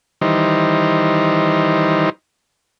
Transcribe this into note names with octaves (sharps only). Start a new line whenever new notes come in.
D#3 E3 G3 D#4 C5